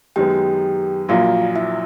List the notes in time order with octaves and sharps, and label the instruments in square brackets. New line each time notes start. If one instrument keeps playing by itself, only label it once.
[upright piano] F#2 D#3 G#3 B3 [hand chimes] G4 G5
[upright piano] A#1 A#2 F#3 A#3 [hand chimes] F4 F5
[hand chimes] E4 E5